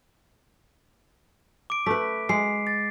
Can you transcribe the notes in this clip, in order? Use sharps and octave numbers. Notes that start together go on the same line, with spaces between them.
D6 D7
A3 B4 B6
G#3 C7
A6